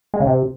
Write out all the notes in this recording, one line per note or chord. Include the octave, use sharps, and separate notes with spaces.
G#3
C#3
C3